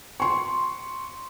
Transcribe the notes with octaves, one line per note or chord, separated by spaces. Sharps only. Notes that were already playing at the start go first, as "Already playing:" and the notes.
C6 C#6